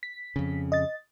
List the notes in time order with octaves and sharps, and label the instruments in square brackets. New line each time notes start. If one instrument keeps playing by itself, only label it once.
[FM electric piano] B6
[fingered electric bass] F2 C#3
[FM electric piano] D#5 A6